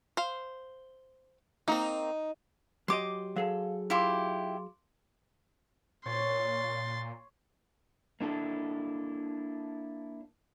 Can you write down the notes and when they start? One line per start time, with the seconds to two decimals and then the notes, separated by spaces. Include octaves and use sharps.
0.17 C5 F5
1.68 A#3 C4 D#4
2.88 F#3 G4 D#5 C6 D6
3.36 F#3 G#4 A4 F5
3.90 E4 F4 G4 F5 C6 D6
6.06 A#2 C#5 C6 A6
8.21 A#3 D4 E4 A4